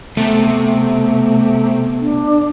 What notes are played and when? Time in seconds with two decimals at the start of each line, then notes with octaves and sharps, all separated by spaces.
0.17 C3 A3 B3
2.00 D4